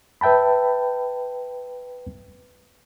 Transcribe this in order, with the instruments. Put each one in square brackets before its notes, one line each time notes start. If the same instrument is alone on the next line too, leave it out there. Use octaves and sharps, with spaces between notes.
[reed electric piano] B4 E5 G5 A5 B5